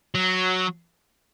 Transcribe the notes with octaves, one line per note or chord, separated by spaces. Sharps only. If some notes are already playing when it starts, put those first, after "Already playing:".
F#3